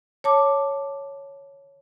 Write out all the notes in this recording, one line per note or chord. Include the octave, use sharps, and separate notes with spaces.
C#5 A5 D6